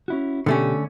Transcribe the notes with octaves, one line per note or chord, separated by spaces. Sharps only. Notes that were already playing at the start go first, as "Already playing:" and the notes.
C#4 E4 F#4
B2 D3 A3 C#4 G4